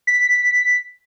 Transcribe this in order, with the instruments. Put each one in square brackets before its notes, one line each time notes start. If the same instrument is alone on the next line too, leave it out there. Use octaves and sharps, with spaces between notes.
[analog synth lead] B6